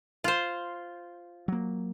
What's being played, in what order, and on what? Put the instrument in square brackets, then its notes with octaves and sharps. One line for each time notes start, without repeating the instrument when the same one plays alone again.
[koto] F4 C5
[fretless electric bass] F#3 A#3